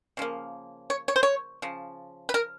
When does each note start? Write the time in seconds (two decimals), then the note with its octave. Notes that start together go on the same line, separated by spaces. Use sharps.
0.17 C#3 F3 A#3
0.90 C#5
1.08 C#5
1.16 C5
1.23 C#5
1.62 C#3 F3
2.29 B4
2.34 A#4